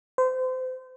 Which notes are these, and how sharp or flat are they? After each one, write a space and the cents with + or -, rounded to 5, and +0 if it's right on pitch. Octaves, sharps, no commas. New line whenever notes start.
C5 -30